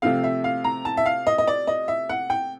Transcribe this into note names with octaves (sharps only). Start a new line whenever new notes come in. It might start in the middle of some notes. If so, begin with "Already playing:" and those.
C3 F3 A3 C4 F5
E5
F5
A#5
A5
E5
F5
D#5
D#5
D5
D#5
E5
F#5
G5